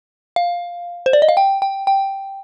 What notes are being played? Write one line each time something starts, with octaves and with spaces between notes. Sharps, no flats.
F5
C5
D5
D#5
F5
G5
G5
G5